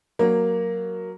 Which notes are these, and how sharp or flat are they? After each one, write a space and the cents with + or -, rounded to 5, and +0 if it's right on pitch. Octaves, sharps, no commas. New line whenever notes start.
F#3 +0 A#3 +0